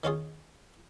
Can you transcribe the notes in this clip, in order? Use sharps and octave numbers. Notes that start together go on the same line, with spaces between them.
D#3 C#4 F4 G#4